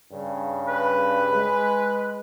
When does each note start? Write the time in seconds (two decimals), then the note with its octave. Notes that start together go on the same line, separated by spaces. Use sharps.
0.12 G2 C#3
0.68 B4
1.32 G#3